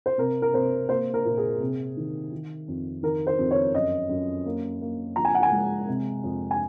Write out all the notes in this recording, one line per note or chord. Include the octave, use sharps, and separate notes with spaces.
C5
C3 A#4
A#4
C3 C5
A#3 C5
A#4
A#2
G#4
C3
D#3
D#3
F2
D#3 A#4
C5
F2
C#5
F#2 D#5
F#2
A#3
A#3
F3 A#5
G#5
F#5
G#5
G#3
C3
F2
G#5